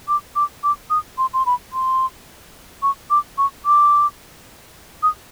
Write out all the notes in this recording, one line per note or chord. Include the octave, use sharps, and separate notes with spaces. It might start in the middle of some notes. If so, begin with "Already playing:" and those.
D6
D6
D6
D#6
C6
C6
B5
C6
C#6
D6
C#6
D6
D#6